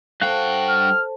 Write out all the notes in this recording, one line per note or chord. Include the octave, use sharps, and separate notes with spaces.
G2 F#4 A4 C5 F5 G5 A5 F#6
F6